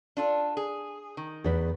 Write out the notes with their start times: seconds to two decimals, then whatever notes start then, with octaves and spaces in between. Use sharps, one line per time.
0.17 D4 F4 A4
0.57 G#4
1.17 D#3
1.44 E2 B4